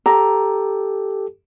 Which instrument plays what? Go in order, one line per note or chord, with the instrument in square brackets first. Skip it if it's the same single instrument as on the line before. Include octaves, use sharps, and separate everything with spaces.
[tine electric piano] G4 A4 [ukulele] A#5